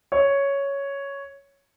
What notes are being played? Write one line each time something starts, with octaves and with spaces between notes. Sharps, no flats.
C#5